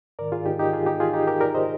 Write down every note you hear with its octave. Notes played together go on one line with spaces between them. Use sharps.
G#2 D#3 A#4 D5
F4 G#4
D#4 G4
D#4 G4
F4 G#4
D#4 G4
F4 G#4
D#4 G4
G4 A#4
A#4 D5
C5 D#5